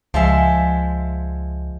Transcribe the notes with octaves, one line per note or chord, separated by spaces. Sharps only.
C#2 F3 G#3 E5